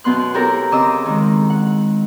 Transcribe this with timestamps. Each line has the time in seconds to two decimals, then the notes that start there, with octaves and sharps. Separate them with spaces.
0.04 F#2 B2 B3 C6 F#6
0.34 E4 G4 A4 A#4 C#5 A#5
0.72 C#3 C4 D#5 A#5 D6 E6
1.06 D#3 G#3
1.50 F#5